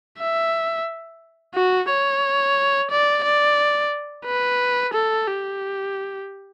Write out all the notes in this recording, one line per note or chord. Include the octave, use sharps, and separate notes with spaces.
E5
F#4
C#5
D5
D5
B4
A4
G4